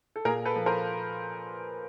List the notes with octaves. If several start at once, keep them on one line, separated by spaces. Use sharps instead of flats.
A4
A#2 G#4 A#4
A4 B4
F3
A#4 C5